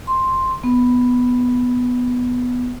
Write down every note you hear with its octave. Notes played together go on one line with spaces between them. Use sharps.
C6
B3